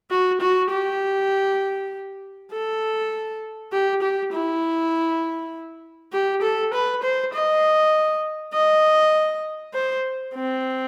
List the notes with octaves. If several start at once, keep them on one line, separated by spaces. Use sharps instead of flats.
F#4
F#4
G4
A4
G4
G4
E4
G4
A4
B4
C5
D#5
D#5
C5
C4